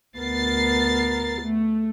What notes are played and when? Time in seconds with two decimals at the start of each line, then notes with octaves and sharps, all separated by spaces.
0.18 D2 B3 A#4 A6 C7
1.41 A3